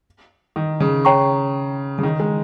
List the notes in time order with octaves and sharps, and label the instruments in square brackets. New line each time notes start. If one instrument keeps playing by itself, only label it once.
[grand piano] D#3
C#3
[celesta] C#5 G5 A#5 C#6
[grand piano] C#3
D#3
G#3